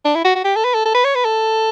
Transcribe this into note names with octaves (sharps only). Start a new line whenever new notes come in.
D4
E4
F#4
F#4
G4
A4
B4
A4
A4
B4
C#5
B4
A4